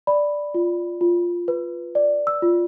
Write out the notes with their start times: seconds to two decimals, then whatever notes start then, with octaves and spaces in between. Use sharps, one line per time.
0.07 D5 B5
0.54 F4
1.01 F4
1.48 B4
1.95 D5
2.27 E6
2.42 F4